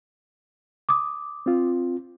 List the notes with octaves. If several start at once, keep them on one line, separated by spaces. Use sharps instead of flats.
D6 D#6
C4 F4